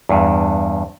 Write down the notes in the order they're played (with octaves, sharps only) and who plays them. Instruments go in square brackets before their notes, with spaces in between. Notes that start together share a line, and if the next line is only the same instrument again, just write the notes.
[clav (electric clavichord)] E2 G2